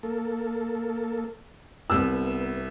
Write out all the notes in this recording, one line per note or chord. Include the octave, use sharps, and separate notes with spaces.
A#3 A4
C2 B3 E6